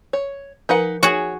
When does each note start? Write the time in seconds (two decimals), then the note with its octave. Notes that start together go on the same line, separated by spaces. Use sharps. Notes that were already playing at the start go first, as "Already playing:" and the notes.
0.13 C#5
0.69 F3 D#4 A#4 B4 F#5 G#5
1.03 F#4 G#4 C#5